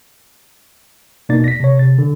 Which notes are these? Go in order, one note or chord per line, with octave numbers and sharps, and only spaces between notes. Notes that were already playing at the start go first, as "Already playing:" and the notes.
B2 A#3 D#4 D5 A6
A#6 B6
C3 C#5
C3 A6
D3